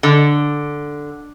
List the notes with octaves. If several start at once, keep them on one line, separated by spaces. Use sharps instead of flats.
D3